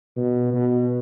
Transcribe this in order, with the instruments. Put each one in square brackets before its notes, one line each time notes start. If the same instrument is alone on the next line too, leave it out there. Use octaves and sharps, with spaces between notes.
[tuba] B2
B2